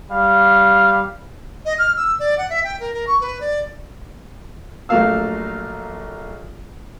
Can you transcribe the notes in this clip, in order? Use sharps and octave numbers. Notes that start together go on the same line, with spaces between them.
G3 F5
D#5
F6
E6
D5
F#5
E5
G5
A#4
A#4
C#6
B4
D5
A#1 F#3 A3 A#3 F5 E6